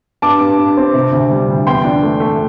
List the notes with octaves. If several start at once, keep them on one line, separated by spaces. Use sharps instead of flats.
G2 A5 D6
G2
G2
C4
C3
D2
G3
D2
E2 G5 C6
D4
A3
A3